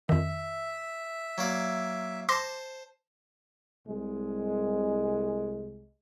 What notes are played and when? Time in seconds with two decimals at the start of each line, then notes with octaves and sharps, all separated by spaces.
0.09 F2 D#3 E5
1.38 F#3 A#3 D5
2.29 C5 A5 C6 D6 A#6
3.87 C2 G#3